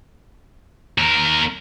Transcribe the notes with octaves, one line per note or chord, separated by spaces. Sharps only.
D#2 A#4